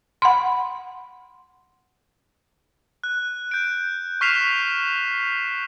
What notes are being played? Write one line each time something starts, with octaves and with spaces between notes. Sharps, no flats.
F#5 B5 C6
F#6
G6 D7
C#6 F6 B6 C7 E7 F7